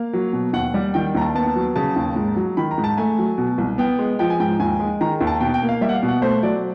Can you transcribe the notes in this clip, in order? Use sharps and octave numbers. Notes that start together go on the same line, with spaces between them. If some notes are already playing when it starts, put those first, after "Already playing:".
Already playing: A#3 F5
F#3
B2
D#2 F#5
G3
D#3 G5
D#2 A#5
A5
B3 A5
F#3
C#3 A5
D#2
G#2
F#3
D#3 B5
A#5
G#2
A5
A3 G#5
F#3
B2
C2
B3 G5
G#3
F3 G5
G#5
G#2 G5
D#2 G#5
G#3
D#3 A#5
D#2
A5
B2 G5
G5
A#3
F5
G3 E5
F#5
F5
B2
F#5
A3 C5
F#3 D5